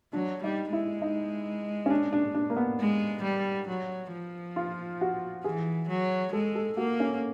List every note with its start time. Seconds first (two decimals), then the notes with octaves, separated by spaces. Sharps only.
0.13 F#3 D4
0.43 G3 D#4
0.72 G#3 E4
1.02 D#4
1.86 C#4
1.90 D4
2.13 D4
2.35 D4
2.50 A#3
2.57 B3
2.80 G#3
3.23 G3
3.68 F#3
4.13 F3
4.56 F4
5.01 F#4
5.44 E3 G#4
5.89 F#3
6.33 G#3 A4
6.55 A4
6.77 A#3 F#4
7.00 C#4